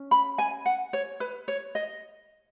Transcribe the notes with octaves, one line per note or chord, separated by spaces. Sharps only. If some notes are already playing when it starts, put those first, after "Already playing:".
Already playing: C#4
B5
G#5
F#5
C#5
B4
C#5
D#5